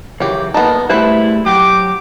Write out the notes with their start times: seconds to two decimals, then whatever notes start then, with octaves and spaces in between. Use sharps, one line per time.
0.20 C#3 E3 F#3 G4 C#5
0.54 A#2 B3 D#4 A4 A5
0.90 G3 A3 E4 B4 C5
1.46 F#3 G4 D6